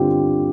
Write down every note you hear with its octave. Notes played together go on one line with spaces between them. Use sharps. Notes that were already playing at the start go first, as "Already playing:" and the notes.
Already playing: G2 D3 C4 F4 G4